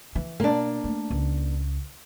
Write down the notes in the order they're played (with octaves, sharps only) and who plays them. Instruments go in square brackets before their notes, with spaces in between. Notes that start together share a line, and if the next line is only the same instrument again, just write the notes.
[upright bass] E3
[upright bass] B2 [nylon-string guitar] A#3 D4
[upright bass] A3
C#2